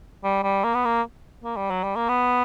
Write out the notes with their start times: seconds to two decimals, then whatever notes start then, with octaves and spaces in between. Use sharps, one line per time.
0.24 G3
0.43 G3
0.64 A#3
0.75 B3
0.85 A#3
1.44 A#3
1.57 G3
1.70 F#3
1.84 G3
1.96 A#3
2.09 B3